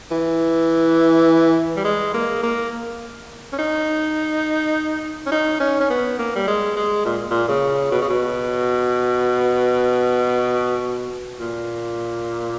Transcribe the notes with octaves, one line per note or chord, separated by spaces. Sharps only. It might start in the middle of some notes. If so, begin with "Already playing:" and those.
E3
G3
G#3
A#3
A#3
C#4
D#4
C#4
D#4
C#4
C#4
B3
A#3
G3
G#3
G#3
A#2
A#2
C#3
B2
C#3
B2
A#2